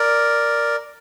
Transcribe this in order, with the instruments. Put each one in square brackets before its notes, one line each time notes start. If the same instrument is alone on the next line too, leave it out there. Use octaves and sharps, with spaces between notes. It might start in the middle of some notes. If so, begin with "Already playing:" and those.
Already playing: [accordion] A#4 D5